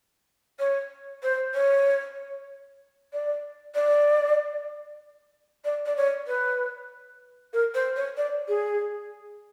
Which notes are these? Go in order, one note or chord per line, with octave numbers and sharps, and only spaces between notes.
C#5
C5
C#5
D5
D5
D5
D5
C#5
B4
A#4
C5
C#5
D5
G#4